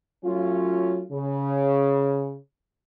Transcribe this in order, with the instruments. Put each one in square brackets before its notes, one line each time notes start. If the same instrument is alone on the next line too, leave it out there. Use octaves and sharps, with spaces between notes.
[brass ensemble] F#3 A3 C#4 F4
C#3